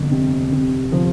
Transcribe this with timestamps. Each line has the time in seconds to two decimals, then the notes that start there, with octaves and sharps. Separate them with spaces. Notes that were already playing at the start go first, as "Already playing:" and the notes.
Already playing: G1 F2
0.11 C3
0.52 C3
0.92 F3